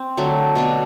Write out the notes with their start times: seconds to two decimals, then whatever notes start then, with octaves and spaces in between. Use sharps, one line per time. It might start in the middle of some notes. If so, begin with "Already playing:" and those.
Already playing: C4
0.17 D3 F#3 A3
0.55 B2 A3 D4